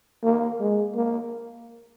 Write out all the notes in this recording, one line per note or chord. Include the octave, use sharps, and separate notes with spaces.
A#3
G#3
A#3